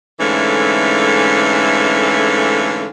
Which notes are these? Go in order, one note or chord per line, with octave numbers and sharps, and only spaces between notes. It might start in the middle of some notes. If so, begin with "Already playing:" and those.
G#2 D3 E3 A3 C#4 F5